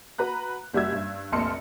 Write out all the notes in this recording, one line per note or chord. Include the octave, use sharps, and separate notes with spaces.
F#4 B4 A#5 B5 F#6
F#1 G3 F#4 E5 E6 G#6
G2
F1 A#1 A5 C6 F6 C#7